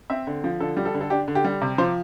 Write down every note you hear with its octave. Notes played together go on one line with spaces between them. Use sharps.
C4 E5
D3
F3
D3 A4
G3
A4
D3
A4
D4 G4
D3
G4
G3
C3
F3 C5